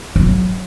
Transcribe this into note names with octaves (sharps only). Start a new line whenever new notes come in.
F#3